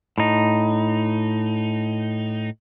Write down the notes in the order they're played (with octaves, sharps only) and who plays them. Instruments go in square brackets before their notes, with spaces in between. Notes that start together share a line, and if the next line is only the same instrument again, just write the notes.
[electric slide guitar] A2 D#4